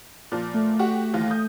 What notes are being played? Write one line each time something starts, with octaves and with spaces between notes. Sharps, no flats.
A#2 F3
A3
F#4 G4 F#5
D#2 E3 F4
D#6 G6